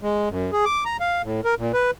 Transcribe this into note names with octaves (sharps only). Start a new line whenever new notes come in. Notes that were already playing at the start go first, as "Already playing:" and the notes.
G#3
F#2
G#4
D6
A#5
F5
A2
A#4
A#2
B4